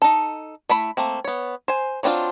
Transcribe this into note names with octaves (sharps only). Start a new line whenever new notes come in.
D#4 A4
A3 E4 B5
A3 A#3 C4
B3 C#5
C5 G#5
F#3 C4 D4 E4 F4